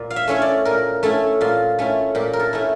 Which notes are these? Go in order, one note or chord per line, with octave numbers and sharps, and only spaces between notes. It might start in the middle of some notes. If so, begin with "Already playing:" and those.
Already playing: A#2
F5
E5
A3 C#4 E4 C#5
D5
A#2 A#4
A3 C#4 E4 A4
A#2 F4
A3 C#4 E4
A#2 G4
A#4
A4
A3 C#4 E4